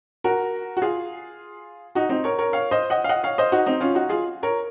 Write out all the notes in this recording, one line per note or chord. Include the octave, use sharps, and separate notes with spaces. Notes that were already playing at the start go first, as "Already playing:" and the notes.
F#4 A#4
F#4
F4 G#4
D#4 F#4
C4 D#4
A#4 C#5
A#4 C#5
C#5 F5
C5 D#5
D#5 F#5
F5
D#5 F#5
C#5 F5
C5 D#5
D#4 F#4
C4 D#4
C#4 F4
D#4 F#4
F4 G#4
A#4 C#5